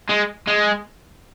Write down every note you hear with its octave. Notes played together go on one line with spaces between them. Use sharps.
G#3
G#3